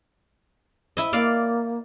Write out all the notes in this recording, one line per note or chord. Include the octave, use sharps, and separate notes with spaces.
E4 D#5
A#3 D5 F5